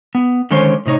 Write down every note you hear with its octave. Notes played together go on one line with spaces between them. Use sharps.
B3
D3 D#3 G#3 C#4 C5 C#5
A2 C3 D#4 C#5